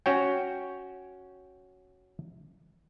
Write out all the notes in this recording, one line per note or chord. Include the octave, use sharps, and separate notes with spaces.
C#4 F#4 C#5 G5